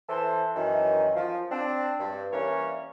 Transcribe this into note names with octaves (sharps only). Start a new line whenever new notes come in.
E3 A4 C5
F#2 D#3 E3
F3
C4 D4
G2
E3 G3 A#3 C#4 C#5